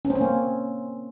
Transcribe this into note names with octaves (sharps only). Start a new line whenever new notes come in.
C#4
C4
C#4
A#3